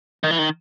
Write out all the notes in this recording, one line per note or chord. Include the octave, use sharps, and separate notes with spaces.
D#3
E3
D#3